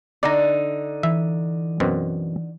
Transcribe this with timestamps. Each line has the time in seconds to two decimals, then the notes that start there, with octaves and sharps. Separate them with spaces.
0.23 D3 D#4 D5 A#5
1.03 E3 E5
1.80 F#2 B2 C4